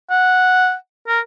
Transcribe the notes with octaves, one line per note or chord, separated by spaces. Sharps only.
F#5
A#4